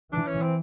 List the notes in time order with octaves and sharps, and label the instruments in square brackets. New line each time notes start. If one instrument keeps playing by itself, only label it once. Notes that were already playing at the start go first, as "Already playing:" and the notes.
[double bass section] E3 [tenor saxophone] D4
[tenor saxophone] C#4
C4